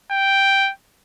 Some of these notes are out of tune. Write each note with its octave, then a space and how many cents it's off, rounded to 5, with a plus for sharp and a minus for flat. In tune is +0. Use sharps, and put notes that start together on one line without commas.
G5 +0